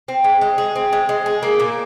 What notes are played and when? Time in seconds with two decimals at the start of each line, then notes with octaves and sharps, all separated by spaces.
0.08 C4
0.24 G#3
0.41 G#3
0.58 G#4
0.76 C4
0.93 G#3
1.09 G#3
1.26 G#4
1.43 A#3
1.60 A#2